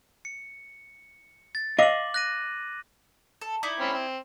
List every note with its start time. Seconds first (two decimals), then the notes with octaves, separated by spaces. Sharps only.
0.25 C#7
1.55 A6
1.79 D#5 F5 D6 F#7
2.14 F#6 A#6 D#7
3.41 A4
3.63 D#4 E4 D5
3.80 C4 C#4 B5
3.93 C4